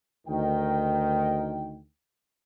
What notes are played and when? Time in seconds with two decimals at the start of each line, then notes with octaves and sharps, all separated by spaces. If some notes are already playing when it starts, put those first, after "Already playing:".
0.27 D2 D#3 G5